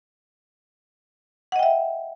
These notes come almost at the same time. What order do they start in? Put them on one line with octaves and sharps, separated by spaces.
F#5 D#5 G5 E5